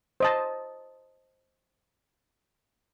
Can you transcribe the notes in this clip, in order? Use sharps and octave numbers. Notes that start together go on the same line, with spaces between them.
C5 D#5 A5